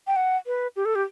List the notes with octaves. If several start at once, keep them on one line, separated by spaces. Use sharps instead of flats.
G5
F#5
B4
G4
A4
G4